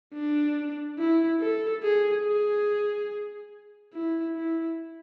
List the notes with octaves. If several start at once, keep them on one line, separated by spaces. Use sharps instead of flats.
D4
E4
A4
G#4
G#4
E4
E4